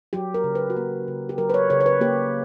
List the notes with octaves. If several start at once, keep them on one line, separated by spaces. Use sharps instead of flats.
F#3 G4
A#4
C#3
B4
F#4
A#3 G4
C#3
G4
F#3 A#4
B4
C#5
C#3 C#5
C#5
B4
A#3 G4